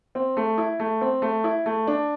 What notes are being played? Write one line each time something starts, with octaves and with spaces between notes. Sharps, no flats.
C4
A3
E4
A3
C4
A3
E4
A3
D4